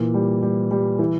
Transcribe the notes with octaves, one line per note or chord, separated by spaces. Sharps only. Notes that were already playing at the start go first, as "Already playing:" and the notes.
Already playing: A#2 E3
G3
G3
G3
E3